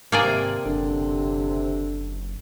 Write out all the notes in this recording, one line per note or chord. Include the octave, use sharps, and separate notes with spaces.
G#1 C3 A#3 G#4 D5
F#1 D3